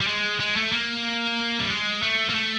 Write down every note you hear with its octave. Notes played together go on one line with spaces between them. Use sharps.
G3
G#3
G#3
A3
A#3
G3
G#3
A3
A#3
A3